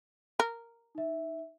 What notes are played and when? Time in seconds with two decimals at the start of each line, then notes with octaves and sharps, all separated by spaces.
0.40 A#4
0.95 D#4 E5